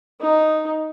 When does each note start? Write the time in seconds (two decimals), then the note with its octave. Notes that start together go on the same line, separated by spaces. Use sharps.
0.21 D#4